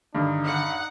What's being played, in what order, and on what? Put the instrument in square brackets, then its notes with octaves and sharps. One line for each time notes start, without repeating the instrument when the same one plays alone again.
[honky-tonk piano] G2 [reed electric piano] D3 D#3 [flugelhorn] D#4
[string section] F#5